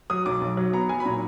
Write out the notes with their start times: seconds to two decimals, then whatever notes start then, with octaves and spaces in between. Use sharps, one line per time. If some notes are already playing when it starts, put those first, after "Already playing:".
0.10 F#3 D#6
0.26 B1 D6
0.41 B1
0.57 F#3
0.73 B3 A#5
0.89 F#3 G#5
1.00 B5
1.05 A#2 A#5